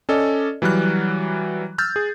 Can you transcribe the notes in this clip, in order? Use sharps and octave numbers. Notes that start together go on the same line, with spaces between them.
C#4 A4 D5 D#5
E3 F#3 G3 F6 F#6
E6 F6 G6 A6
G#4